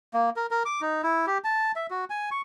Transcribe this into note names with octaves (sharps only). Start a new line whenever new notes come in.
A#3
A#4
A#4
D6
D#4
E4
G4
A5
E5
F#4
G#5
C#6